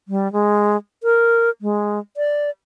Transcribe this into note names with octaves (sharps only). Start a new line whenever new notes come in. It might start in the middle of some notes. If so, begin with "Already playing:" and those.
G3
G#3
A#4
G#3
D5